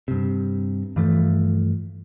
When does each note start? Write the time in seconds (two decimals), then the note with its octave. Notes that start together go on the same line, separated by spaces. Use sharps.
0.08 G2 C3
0.96 G2 E3 F3 A3